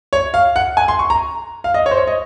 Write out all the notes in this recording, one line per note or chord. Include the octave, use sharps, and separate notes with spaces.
C#5
F5
F#5
G#5
C6
C#6
A#5
F5
D#5
C#5
C5
C#5
D#5